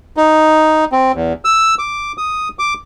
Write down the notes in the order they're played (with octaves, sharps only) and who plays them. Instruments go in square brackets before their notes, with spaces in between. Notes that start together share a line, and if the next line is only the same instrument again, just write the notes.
[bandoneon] D#4
C4
E2
E6
D6
D#6
D6